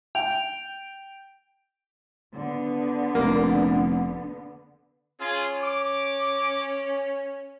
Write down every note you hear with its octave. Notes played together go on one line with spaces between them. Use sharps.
G5 F7
D3 B3
F1 A#3
C#4 F4 G#4
D6